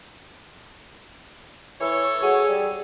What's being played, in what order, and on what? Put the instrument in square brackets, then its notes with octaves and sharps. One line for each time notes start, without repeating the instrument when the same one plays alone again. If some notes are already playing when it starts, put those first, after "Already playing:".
[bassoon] E3 [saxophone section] A4 C#5
[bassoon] F#4 [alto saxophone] G#4
[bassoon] G3